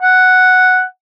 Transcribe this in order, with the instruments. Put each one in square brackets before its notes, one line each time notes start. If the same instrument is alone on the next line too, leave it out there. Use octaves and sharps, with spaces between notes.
[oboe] F#5